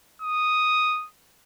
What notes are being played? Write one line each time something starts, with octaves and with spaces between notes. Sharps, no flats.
D#6